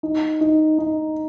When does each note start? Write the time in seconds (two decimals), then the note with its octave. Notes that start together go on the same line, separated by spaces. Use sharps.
0.03 D#4
0.41 D#4
0.79 D#4